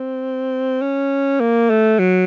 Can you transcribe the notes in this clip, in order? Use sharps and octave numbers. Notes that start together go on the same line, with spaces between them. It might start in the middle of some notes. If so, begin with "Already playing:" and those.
Already playing: C4
C#4
A#3
A3
F#3